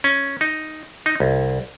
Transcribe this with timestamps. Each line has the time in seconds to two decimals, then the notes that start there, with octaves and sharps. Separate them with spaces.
0.04 C#4
0.41 D#4
1.06 D#4
1.20 C2